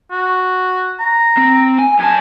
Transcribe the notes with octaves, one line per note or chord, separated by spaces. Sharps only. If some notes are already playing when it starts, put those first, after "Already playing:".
F#4
A#5
C4
G#5
F#2 G#5 A5